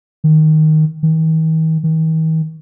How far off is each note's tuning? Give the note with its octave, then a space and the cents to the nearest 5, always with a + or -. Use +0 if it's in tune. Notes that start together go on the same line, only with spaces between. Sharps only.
D#3 +0
D#3 +45
D#3 +45